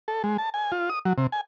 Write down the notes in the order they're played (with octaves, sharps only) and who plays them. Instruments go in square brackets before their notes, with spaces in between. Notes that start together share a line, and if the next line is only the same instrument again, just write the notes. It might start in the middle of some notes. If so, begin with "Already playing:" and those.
[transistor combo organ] A4
G#3
A5
G#5
F4
D#6
F#3
C3
G#5